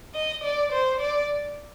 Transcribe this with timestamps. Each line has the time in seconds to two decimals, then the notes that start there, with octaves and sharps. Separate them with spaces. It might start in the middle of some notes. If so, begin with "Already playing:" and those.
0.15 D#5
0.43 D5
0.72 C5
1.00 D5